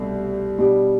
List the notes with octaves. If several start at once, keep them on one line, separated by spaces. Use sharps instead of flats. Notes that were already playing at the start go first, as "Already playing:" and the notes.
Already playing: C2 B2 A3 D4
B2 G3 D4 G4